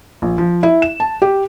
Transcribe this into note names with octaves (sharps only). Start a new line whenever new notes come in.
A#1
F3
E4
E7
A5
G4